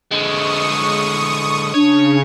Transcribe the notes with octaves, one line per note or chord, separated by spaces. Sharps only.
D3 G#3 C#6 D#6
C#3 D4 C#5